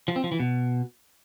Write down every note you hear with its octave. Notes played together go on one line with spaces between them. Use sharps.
F3
C4
F3
E3
B2